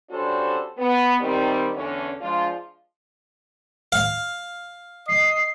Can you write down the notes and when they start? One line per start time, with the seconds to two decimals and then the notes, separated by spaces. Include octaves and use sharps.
0.10 G3 C#4 D4 F#4 A4 C5
0.78 B3
1.20 D#3 G3 C4
1.74 E2 D3 C#4
2.21 F3 G#3 D4 F4
3.92 F5
5.08 D#5 C7